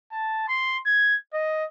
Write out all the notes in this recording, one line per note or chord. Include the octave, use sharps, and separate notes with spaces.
A5
C6
G#6
D#5